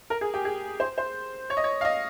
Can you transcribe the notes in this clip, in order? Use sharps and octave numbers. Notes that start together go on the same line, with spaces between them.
A#4
G#4
G4
G#4
C5
C5
C#5
D#5
C#5
F5
D#5